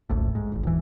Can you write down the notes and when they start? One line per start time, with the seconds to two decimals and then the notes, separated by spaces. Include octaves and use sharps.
0.10 D#1 A#1 A2
0.35 G#2
0.52 D#1 G#1
0.63 D#1 E3